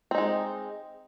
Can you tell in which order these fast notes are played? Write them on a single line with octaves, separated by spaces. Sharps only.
C4 D#4 G#3